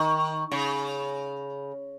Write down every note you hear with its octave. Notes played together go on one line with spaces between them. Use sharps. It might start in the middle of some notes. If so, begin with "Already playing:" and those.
Already playing: D#3
C#3